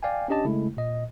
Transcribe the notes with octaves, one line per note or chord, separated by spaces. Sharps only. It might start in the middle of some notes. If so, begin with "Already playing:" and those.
D5 F5 G5 G#5
C#4 D4 G4 D#5 A5
C#3 G#3 A3 E4
A#2 D#5